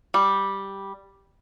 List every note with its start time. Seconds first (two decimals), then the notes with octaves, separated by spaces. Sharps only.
0.14 G3